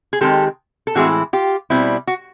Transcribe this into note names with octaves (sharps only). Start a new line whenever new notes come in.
G#4
D#3 G#3 C4 G4 A4
A4
A2 E3 G#3 C4 E4 F#4 G#4
F4 G4
B2 G3 C4 E4
F#4